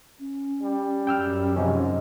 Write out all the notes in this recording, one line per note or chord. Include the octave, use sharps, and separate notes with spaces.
C#4
G3
F#2 G5 E6 F6
G#2 C3 F3 C#4 D#5